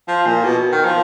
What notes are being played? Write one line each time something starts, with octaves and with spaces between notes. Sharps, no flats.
F3
A#2
B2
D#3
F3